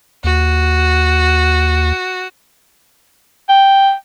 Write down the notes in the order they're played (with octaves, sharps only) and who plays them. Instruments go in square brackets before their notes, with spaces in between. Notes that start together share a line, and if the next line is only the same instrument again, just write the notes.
[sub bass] D#2 [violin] F#4
[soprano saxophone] G5